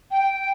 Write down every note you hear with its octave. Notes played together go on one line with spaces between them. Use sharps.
G5